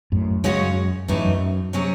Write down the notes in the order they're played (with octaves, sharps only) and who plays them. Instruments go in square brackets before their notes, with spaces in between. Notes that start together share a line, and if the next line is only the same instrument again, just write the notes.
[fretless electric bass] F#2 A2
[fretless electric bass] F#2 [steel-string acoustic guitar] C#3 G#3 C#4 F#4 C#5
[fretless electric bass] F#2 [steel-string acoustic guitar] A2 E3 A3 D#4
[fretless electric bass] F#2
[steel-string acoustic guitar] C3 F#3 C#4 G#4